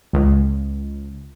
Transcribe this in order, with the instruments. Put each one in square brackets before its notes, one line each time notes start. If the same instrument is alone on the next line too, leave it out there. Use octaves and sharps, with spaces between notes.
[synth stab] C#2